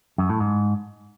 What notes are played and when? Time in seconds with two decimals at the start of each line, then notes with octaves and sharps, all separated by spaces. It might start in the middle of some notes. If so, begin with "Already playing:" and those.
0.18 F#2
0.29 A2
0.40 G#2